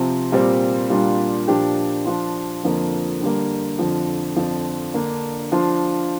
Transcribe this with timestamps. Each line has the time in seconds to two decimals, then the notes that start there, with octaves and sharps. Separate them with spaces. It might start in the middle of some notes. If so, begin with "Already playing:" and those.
Already playing: C3 F3 C4
0.32 A#2 G3 C4
0.90 A#2 G3 D4 F4
1.48 A#2 F3 D4 G4
2.05 F3 D4 F4
2.63 F2 D3 F3 A#3
3.21 D3 G3 A#3
3.79 F2 D3 F3
4.36 F2 D3 F3
4.94 D3 A#3 D4
5.52 F3 D4 F4